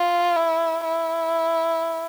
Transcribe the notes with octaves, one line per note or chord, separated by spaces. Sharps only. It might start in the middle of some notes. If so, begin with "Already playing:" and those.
Already playing: F4
E4
E4